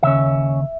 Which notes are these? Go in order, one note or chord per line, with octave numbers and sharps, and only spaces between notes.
D#2 C#3 C#4 E5